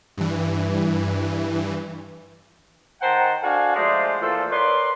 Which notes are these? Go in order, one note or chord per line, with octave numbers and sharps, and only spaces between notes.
G2 E3
D#3 C5 F#5 G5 A5 A#5
D4 F#4 A4 F5 G#5
F3 G#3 A3 C5 D5
A#2 E3 A3 F4 A4 C5
A#4 B4 C#5 D5 C6